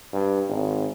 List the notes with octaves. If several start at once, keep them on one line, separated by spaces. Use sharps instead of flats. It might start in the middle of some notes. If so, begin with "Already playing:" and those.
G2
G#1